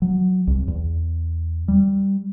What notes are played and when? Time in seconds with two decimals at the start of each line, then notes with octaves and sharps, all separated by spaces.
0.02 F#3
0.47 C2
0.68 E2
1.68 G3